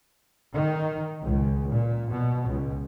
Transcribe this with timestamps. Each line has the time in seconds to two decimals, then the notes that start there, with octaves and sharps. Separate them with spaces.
0.55 D#3
1.21 C#2
1.70 A#2
2.11 B2
2.47 C#2